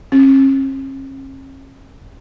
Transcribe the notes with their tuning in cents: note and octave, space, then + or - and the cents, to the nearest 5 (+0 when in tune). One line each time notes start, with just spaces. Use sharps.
C#4 -45